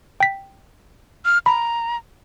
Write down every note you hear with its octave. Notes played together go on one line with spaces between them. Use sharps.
G5 B6
F6
A#5 B5